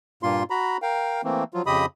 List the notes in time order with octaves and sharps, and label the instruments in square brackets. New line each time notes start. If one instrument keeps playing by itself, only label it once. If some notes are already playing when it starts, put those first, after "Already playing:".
[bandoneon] G2 A#2 A#3 F4 C6
F#4 A#5 B5
A#4 F5 G5
E3 A3 A#3 C4
F3 F#3 F4
F2 C#3 G4 D#5 B5 D#6